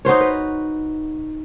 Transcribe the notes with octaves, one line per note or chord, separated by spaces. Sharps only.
D#4 F#4 C5 C#5
B4